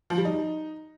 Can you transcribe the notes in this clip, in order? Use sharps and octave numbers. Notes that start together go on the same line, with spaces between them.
F3
G3
D#4